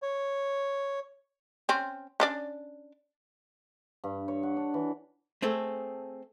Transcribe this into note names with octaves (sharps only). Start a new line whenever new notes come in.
C#5
C4 C#4
C#4 D4 D5
G2
C#5
F#5
D4
E3
A3 C4 G#4 A4